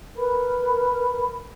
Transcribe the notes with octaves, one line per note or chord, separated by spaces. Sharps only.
A#4 B4 B5